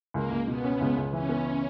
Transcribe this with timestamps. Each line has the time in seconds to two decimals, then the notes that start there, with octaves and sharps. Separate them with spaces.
0.14 C#2 A#3
0.31 C#2
0.47 B2 B3
0.64 C#4
0.80 C#2
0.97 C#2
1.13 E3 C#4
1.29 B3